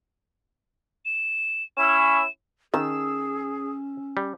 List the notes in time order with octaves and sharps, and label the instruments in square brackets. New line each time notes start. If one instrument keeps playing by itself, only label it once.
[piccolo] E7
[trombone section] C#4 E4 [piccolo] E7
[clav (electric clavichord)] D#3 [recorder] C#4 [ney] G#4 [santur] E6
[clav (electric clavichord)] G3